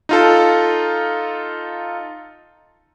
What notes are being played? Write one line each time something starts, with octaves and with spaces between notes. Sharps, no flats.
D#4 F4 A4